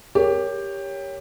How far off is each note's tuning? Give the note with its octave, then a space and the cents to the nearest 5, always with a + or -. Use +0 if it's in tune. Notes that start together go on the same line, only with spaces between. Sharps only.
G4 +15 A#4 +0 C#5 +5